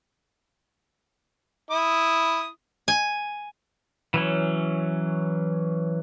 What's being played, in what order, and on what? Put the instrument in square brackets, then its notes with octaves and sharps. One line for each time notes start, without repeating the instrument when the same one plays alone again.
[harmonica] E4 D#6
[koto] G#5
[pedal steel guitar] E3 F#3 C#4